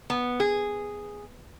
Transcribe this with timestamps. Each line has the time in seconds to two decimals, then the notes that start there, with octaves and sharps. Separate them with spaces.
0.10 B3
0.40 G#4